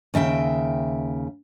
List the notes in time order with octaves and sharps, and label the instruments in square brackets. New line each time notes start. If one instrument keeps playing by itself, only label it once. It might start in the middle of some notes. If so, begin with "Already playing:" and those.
[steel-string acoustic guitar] D#2 C#3 E5 G5